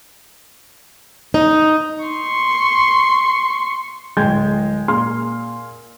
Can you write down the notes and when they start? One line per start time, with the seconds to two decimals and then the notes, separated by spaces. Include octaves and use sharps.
1.34 D#4
2.04 C6 C#6
4.17 D1 G#3 G#4 G5 G6 G#6
4.88 A#2 G#4 C6 F6